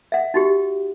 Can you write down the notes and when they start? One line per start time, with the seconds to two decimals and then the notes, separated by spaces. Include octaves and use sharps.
0.12 E5 F#5
0.34 D#4 F#4 G4